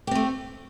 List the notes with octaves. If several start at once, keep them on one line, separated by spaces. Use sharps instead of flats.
A3 C4 G4